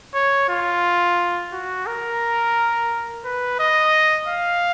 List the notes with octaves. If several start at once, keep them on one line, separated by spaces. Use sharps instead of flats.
C#5
F4
F#4
A#4
B4
D#5
F5